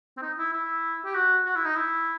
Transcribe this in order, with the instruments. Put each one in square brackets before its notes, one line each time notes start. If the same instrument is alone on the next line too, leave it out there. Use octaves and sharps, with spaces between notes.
[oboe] C4
D#4
E4
E4
G4
F#4
F#4
E4
D#4
E4